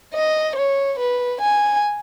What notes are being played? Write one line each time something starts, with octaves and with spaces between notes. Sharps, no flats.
D#5
C#5
B4
G#5